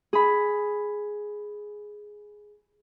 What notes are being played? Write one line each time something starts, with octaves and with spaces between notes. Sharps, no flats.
G#4 B5